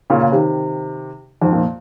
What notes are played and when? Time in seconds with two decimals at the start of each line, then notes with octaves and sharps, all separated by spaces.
0.10 A#2 C#3
0.23 C#3
0.32 C3 D#3
1.41 F2 G#2
1.53 A#2